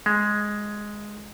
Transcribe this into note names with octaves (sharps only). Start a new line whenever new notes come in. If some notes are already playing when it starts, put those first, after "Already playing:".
G#3